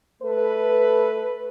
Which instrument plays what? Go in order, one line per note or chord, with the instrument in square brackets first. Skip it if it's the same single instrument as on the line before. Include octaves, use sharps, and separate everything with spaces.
[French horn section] A3 A4 B4